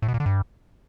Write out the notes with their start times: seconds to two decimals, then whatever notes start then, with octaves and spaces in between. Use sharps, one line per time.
0.02 A2
0.08 B2
0.14 A#2
0.20 D3
0.26 G2